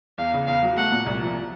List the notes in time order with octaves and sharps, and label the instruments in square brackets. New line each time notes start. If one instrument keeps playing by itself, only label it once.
[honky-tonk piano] E2 [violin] F5
[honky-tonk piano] C#3
[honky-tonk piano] E2 [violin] F5
[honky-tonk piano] F#3
[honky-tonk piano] A3 [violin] F#5
[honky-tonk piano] A#2
C2
F3